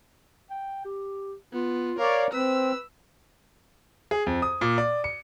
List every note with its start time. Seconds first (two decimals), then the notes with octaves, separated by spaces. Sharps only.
0.50 G5
0.85 G4
1.53 B3 F4
1.99 A#4 C#5 D5 F5
2.33 C4 B4 E6
4.11 G#4
4.27 F2
4.42 D#6
4.61 A#2
4.78 D5
5.04 C#7